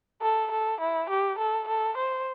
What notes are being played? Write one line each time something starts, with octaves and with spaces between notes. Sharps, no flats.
A4
A4
E4
G4
A4
A4
C5